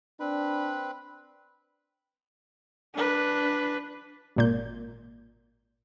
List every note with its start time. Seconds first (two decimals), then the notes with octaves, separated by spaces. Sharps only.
0.20 C4 D4 B4 B5
2.95 D4 B4
4.36 G#1 A#2 G6